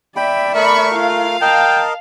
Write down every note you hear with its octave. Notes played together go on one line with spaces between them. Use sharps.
D5 E5 G5 B5
A3 A#4 B5 C#6
F4 F5
A#4 D#5 G5 A5